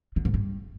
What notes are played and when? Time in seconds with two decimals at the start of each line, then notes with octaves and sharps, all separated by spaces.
0.16 D3
0.25 G#2
0.34 G2